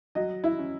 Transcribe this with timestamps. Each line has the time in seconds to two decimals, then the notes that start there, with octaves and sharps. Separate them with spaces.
0.15 F#3 D#5
0.44 E4
0.59 C#4